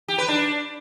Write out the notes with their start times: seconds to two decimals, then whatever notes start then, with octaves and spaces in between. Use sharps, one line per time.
0.08 G4
0.18 B4
0.28 D4